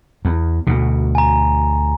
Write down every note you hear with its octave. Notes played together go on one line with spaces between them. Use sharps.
E2
D2 B2
G#5 A#5